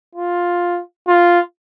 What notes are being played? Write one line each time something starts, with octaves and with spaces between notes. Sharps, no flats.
F4
F4